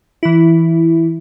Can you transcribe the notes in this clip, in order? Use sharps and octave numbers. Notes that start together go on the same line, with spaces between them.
E3 E4